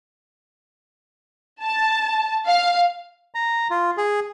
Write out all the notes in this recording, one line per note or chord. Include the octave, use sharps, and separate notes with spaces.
A5
F5
A#5
F4
G#4